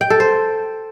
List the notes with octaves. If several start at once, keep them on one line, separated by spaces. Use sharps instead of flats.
G5
A4
C5